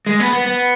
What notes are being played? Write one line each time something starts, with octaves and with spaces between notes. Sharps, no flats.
G#3
B3
B3
B3